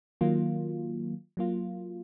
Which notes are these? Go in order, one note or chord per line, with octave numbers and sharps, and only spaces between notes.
D#3 F#3 A#3 F4
F#3 A#3 F4